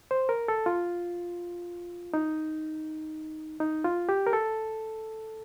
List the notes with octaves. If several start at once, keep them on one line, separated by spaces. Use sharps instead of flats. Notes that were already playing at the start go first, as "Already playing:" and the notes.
C5
A#4
A4
F4
D#4
D#4
F4
G4
A#4
A4